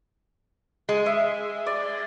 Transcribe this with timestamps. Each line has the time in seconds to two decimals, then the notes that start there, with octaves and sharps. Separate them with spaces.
0.89 G#3
1.06 E5
1.66 D5